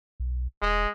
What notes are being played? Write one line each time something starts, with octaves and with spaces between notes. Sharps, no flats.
B1
E1 G#3